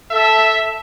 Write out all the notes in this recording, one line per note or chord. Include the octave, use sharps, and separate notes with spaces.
A4 E5